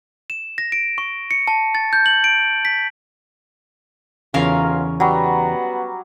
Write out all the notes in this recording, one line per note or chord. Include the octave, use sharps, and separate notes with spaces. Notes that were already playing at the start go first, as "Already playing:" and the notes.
E7
A#6
D7
C#6
C#7
A5
A6
G6
F#7
D7
B6
B1 E2 C#3 C#4 F4 A#4 F5
F#3 G3 B3 F#4